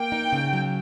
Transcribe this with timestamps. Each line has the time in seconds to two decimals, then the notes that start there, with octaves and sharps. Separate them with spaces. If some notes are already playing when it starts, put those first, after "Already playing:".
Already playing: A#3 G5
0.12 D#4
0.32 C#3
0.53 F#3